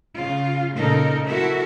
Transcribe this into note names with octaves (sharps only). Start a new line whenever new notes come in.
C#3 F4
A#2 C#3 D#4 A4 A#4
E4 F#4 A4 A#4 E5